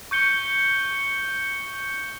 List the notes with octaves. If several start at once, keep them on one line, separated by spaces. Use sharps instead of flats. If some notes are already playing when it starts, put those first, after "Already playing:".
C#6 G6 C#7 G7